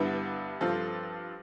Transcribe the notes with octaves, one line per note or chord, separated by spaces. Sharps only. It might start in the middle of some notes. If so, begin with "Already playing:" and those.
Already playing: G2 D3 G3 B3 E4
G2 F3 C4 F4 A4